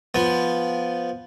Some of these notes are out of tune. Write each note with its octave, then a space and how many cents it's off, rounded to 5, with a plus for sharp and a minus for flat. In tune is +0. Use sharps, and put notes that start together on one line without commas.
F3 +0 B3 +0